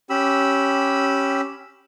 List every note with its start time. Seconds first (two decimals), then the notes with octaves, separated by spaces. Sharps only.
0.10 C#4 G4 B5 E6